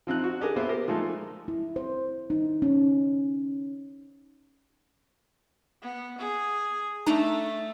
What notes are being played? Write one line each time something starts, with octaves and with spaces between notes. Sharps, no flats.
F3 C4 D#4 F#6
F#4
D4 G4 G#4 A#4
A#3 B3 C5 E5
G4 A#4
F3 G#3 A3 D#4
E4
C5
D#4
C#4
B3
G#4
A3 D4 D#4 A#5